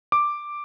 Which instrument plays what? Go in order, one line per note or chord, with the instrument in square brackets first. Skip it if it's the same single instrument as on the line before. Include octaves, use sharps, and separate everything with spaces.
[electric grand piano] D6